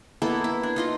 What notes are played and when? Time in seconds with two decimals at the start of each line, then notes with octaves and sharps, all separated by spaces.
0.22 A#3 B3 E4 A4
0.44 E4
0.63 D4
0.76 D#4 F4 D#5